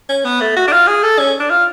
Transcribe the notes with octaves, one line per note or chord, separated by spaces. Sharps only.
C#4
B3
A3
F#4
D4
F4
G#4
A4
C#4
D4
F4